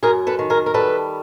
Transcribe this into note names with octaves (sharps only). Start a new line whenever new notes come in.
F#2 G#4 A#4
A4 B4
D#3
G#4 A#4
A#4
G3 A4 B4